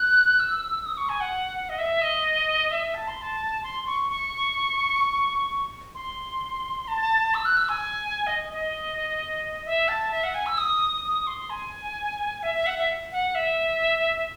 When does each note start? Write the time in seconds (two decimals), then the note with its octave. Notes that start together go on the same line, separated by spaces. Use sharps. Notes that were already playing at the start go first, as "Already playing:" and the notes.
Already playing: F#6
0.40 E6
0.86 D#6
0.97 C#6
1.09 G#5
1.20 F#5
1.69 D#5
1.78 E5
2.01 D#5
2.71 E5
2.94 A5
3.08 C6
3.22 A5
3.64 C6
3.86 C#6
4.10 C#6
5.95 C6
6.88 A5
7.34 E6
7.45 F#6
7.57 E6
7.69 G#5
8.27 D#5
8.51 D#5
9.65 E5
9.88 A5
10.11 E5
10.24 F#5
10.34 G#5
10.46 E6
10.58 D#6
11.04 D#6
11.27 C6
11.50 G#5
12.43 E5
12.54 E5
12.66 F#5
12.77 E5
13.12 F#5
13.35 E5